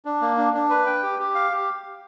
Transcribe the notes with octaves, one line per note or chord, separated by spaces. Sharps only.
D4
A#3
D4
D4
B4
G5
G4
G4
F5
G4